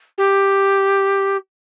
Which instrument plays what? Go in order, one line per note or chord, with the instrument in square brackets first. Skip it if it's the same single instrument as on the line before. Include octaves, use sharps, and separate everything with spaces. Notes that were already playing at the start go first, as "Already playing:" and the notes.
[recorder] G4